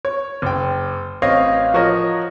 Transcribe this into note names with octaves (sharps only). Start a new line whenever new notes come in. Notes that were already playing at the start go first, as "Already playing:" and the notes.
C#5
F#1 G5
A1 C4 C#5 D#5 F5
F3 F#4 A#4 C#5 D#5